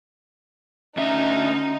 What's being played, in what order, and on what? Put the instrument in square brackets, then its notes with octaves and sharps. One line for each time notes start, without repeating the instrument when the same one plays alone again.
[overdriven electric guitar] D2 E5 [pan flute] C#4 [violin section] D#4